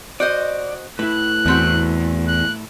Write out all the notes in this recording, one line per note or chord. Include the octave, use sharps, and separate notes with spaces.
F#4 C5 D5 D#5
A2 E4 B4 F#6
E2 A3 C4 F#4
F#6